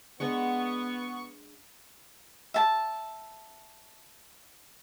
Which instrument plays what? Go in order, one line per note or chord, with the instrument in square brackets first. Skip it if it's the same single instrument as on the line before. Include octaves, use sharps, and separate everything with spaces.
[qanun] G#3 D4 B4 [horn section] B3 [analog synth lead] C#6
[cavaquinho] E5 A5